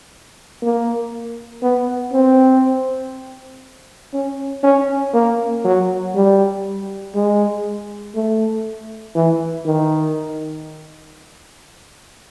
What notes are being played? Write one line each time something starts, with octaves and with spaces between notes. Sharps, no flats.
A#3
B3
C4
C#4
C#4
A#3
F#3
G3
G#3
A3
E3
D#3